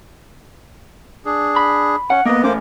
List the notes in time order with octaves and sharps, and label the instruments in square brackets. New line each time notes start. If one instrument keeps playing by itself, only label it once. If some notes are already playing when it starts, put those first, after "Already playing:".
[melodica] D4 G#4
[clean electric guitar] B5
[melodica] C#4 [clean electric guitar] F#5
[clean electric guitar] A#3 B3 [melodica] D#5
[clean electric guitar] A2 C#4 [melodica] A#3 C5 D6